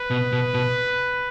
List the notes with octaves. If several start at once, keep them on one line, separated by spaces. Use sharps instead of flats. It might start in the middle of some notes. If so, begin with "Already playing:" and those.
Already playing: B4
B2
B2
B2